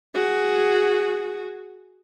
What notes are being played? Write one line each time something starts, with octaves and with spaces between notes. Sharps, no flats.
F#4 G#4